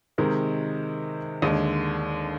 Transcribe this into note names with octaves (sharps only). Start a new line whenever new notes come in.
C3 D#3 G#3 D#4 A#4
D#2 D3 G#3